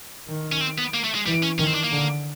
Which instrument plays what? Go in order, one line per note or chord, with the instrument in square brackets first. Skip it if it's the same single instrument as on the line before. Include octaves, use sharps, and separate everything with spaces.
[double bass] D#3
[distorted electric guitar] C#4
C4
B3
A#3
A3
G#3
[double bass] E3 [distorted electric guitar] G3
[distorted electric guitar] C#4
[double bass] D#3 [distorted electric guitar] C#4
[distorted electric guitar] C4
D4
A#3
[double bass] D3